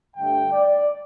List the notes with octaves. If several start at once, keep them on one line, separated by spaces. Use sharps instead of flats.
G2 D3 A3 D4 G5
D5